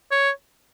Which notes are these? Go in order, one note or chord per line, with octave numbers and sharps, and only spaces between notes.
C#5